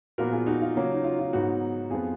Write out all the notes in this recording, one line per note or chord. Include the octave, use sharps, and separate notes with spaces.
A#2 F3 B3 F#4 A#4
F4 G#4
D#4 F#4
F4
C#3 F#3 A#3 C#4
D#4
F4
F4
G#2 F#3 B3 D#4 F#4
F2 F3 B3 F4 G#4